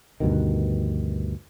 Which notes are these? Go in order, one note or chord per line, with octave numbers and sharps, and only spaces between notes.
D2 G2 B2 D#3